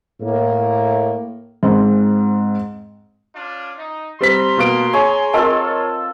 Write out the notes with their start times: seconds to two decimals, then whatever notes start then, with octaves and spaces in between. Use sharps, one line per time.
0.21 A2 A#3
1.63 G#2 C4
3.35 C#4 D4 F4
3.78 D#4
4.21 G3 C4 A#5 C6 B6
4.58 B2 A#3 D7
4.93 G#4 C#5
5.33 C4 F4 A4 A#4 D#5 A5